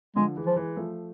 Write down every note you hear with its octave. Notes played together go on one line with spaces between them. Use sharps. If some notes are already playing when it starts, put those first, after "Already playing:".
D3 F3 G#3
E3 G#3
F3
E3 G#3
F3 A3